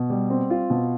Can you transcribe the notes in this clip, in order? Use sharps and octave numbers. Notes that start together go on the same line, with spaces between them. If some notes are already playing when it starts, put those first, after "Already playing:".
Already playing: B2
G3
C4
F4
B2